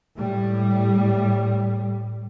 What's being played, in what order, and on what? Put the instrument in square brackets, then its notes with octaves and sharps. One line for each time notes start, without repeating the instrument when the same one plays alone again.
[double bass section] A2 G3